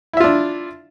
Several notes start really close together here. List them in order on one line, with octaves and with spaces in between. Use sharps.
E4 E5 F4 D4